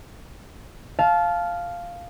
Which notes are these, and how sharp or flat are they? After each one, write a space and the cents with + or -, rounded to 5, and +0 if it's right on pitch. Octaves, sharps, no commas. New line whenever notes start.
F5 +0 A5 -25